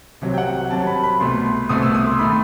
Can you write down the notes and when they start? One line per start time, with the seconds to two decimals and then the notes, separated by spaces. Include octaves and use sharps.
0.21 C2 C3 F#3
0.34 G5
0.38 F#5
0.71 C2 C3 F#3 A5
0.87 B5
1.04 B5
1.20 C2 B2 A3 C6
1.69 C2 B2 A3 D#6
1.82 E6
1.94 D#6
2.07 C6
2.19 D#3 A3 B5